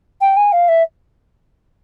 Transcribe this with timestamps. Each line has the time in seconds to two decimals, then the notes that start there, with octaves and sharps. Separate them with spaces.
0.21 G5
0.36 G#5
0.52 F5
0.68 E5